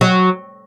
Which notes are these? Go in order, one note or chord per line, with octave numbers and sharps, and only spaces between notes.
F#3